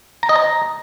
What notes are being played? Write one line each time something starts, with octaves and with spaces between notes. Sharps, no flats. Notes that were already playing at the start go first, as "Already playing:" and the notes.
A#5
D#5
A#5